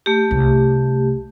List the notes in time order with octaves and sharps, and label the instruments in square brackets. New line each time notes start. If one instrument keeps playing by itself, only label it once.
[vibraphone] A3 G4
[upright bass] C2